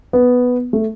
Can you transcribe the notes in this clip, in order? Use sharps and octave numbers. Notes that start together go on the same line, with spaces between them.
B3
A3